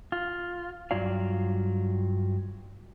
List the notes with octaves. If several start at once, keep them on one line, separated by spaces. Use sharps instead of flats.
F4
G2 F#3 F4 D5 F5